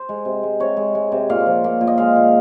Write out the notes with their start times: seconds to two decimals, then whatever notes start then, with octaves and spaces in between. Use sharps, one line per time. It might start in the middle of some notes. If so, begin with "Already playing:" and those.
Already playing: C5
0.09 G#3
0.25 C3
0.43 G#3
0.60 C3 C#5
0.77 G#3
0.95 G#3
1.12 C3
1.30 A#2 F5
1.46 F3
1.64 A#2
1.81 A#2
1.87 D#5
1.98 G#3 F5
2.16 A#2